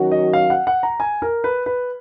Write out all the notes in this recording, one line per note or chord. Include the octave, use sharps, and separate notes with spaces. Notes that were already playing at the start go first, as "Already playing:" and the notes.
Already playing: D#3 F#3 C#4 F#4
D#5
F5
F#5
F#5
A#5
G#5
A#4
B4
B4